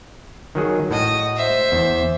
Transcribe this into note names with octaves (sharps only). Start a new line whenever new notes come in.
D#3 F#3 G#4
A2 F#4 D#5
C5 E5
E2